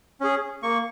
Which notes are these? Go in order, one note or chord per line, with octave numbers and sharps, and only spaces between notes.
C#4 G#4
A#3 C#6